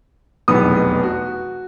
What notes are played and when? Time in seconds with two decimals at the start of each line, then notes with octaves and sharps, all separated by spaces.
0.48 F1 B1 E2 B3 D#4 D#6
1.03 F#4